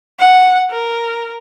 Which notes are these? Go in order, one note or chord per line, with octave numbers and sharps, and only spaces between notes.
F#5
A#4